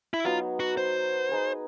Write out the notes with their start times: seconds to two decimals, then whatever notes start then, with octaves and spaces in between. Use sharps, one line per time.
0.14 E4
0.24 F#3 B3 D#4 F4
0.60 F#4
0.77 C5
1.29 D#4 G#4 B4